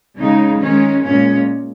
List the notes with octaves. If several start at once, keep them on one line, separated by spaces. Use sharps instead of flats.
C#3 G#3 D#4
D#3 G#3 C#4
A#2 G#3 C#4